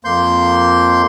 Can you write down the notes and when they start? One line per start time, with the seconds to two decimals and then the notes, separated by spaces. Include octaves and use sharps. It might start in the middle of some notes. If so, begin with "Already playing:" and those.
0.05 F2 A#3 C6 G6